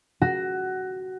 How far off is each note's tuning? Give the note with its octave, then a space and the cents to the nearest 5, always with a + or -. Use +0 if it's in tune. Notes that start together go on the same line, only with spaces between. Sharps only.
F#4 +15